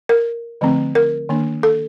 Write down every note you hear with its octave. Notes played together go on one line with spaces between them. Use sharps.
A#4
D3 F3 A3 C4
A#4
D#3 A#3 D4
A4